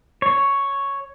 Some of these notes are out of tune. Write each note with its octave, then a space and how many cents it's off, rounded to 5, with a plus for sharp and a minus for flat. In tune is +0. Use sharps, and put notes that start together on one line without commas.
C#5 +0